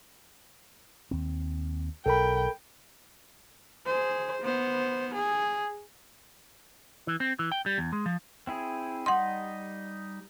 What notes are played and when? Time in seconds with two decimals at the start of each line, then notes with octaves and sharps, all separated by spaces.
1.11 D#2 C4
2.06 B1 A4 A#4 G5 B5
3.86 G#4 C5
4.42 B3 C5
5.15 G#4
7.07 E3
7.20 C4
7.39 E3
7.52 G5
7.66 G3
7.78 E2
7.93 G#3
8.06 F3
8.47 C4 E4 G#4
9.06 G3 D#4 D#5 F#5 C6